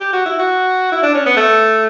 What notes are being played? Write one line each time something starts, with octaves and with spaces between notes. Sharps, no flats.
G4
F#4
E4
F#4
E4
D4
C#4
B3
A3